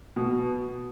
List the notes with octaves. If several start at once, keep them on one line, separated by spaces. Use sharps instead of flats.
B2